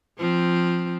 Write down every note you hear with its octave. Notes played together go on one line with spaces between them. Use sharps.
F3 C4